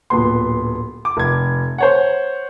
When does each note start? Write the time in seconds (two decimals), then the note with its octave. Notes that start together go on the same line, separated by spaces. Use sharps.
0.10 D1 A#2 B3 C6
1.05 D6
1.17 F1 G#6
1.78 C5 C#5 F#5